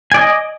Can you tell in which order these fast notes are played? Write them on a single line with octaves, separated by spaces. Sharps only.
G#5 D5 D#5